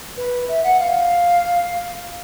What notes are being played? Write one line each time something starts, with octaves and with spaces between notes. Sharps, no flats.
B4
E5
F#5
F5